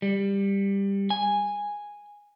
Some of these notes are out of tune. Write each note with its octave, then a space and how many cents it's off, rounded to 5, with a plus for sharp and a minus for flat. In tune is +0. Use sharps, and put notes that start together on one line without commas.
G3 +15
G#5 -5